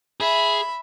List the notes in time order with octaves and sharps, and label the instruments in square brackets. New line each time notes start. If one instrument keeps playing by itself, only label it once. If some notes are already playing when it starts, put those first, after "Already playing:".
[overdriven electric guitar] G#4 [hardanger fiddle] E5 B5